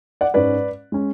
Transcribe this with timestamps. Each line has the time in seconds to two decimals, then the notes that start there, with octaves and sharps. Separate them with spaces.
0.21 D5 F#5
0.34 G#2 G#3 C#4 B4 D5
0.92 G#3 C#4